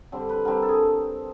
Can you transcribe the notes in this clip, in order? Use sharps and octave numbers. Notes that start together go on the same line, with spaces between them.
D3 G3 C4
B4
D3 G3 C4 A#4
A4
G#4